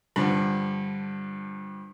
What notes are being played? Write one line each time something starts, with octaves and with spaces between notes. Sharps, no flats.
G2 D3 F3